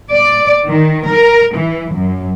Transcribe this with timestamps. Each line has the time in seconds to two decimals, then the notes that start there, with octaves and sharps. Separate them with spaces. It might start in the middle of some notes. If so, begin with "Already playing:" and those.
0.13 D5
0.68 D#3
1.09 A#4
1.56 E3
1.94 F#2